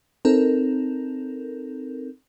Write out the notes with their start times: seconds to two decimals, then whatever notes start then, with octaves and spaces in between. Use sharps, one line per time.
0.25 C4 D#4 A4 A#4